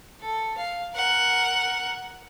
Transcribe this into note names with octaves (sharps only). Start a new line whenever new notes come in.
A4
F5
A#4 F#5